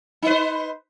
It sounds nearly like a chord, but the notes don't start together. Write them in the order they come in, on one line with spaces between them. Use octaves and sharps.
D#4 B4 C5